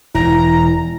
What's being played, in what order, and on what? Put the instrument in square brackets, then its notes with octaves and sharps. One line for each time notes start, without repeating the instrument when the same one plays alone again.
[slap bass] E1 [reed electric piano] E4 [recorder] A#5